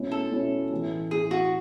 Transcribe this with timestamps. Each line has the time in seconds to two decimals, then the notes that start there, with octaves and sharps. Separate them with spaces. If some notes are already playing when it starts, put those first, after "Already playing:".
Already playing: B2 A3 C#4 E4
0.12 A4
0.32 B2 A3 C#4 E4
0.71 A2 E3 A3
1.11 A2 E3 A3 G#4
1.31 F#4